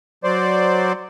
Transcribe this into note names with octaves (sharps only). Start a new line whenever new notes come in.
F#3 C5 D5